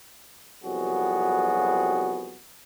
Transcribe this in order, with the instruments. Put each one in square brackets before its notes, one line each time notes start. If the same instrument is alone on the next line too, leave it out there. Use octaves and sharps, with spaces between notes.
[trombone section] C2 F2 F#3 B3 F#4 G#4